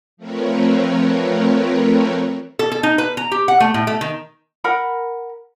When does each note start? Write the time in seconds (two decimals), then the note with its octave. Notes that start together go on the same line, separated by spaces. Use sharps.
0.17 F3 A3 C4 A#4 B4 C#5
2.59 A4
2.72 A4
2.83 D#4
2.98 B4
3.17 A#5
3.32 G4
3.48 F#5
3.60 A3
3.74 A2
3.87 A3
4.01 D#3
4.64 A#4 F#5 B5